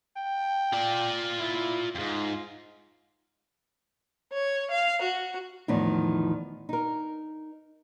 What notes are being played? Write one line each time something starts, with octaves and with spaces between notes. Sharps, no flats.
G5
F4 D5
E4
F2 G#2 F4
C#5
F5
F#4
E2 A2 D#3 F3
D#4 A#4